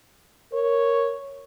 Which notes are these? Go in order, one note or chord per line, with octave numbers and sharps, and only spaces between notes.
A#4 C#5